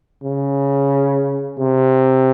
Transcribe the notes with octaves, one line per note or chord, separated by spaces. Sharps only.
C#3
C3